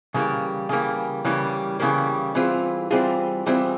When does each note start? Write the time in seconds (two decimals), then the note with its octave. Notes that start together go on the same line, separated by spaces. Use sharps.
0.14 C#3 E3 G3 A#3
0.69 C#3 E3 G3 A#3
1.25 C#3 E3 G3 A#3
1.80 C#3 E3 G3 A#3
2.35 E3 G3 C4 F4 G#4
2.91 E3 G3 C4 F4 G#4
3.46 E3 G3 C4 F4 G#4